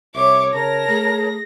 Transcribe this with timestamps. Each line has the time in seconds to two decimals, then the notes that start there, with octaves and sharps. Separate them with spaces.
0.14 C2 C#5 E5 D6
0.53 C#3 A#4 C#5 A5 A#5 A#6
0.88 A3 G#4